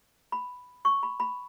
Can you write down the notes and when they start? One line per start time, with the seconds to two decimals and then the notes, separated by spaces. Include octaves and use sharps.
0.32 B5
0.85 C#6
1.03 B5
1.20 B5